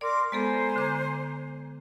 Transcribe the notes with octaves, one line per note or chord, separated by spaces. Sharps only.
A#4 D5 C6 D6
G#3 B3 A4 C5 G#5 A#5
D3 D6 G#6